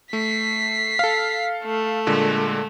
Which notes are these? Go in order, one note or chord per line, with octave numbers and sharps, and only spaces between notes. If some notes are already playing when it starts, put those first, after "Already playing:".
A3 B6 C7
A4 F5
A3
A#2 D3 G#3